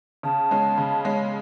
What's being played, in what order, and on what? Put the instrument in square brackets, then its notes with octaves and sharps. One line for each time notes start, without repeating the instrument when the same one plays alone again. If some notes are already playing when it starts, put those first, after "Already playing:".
[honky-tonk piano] C#3 [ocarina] A5
[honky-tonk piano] G#3 C#4
C#3
G#3 C#4